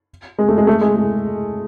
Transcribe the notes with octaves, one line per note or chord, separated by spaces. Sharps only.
G#3
A3
G#3
A3
G#3
G#3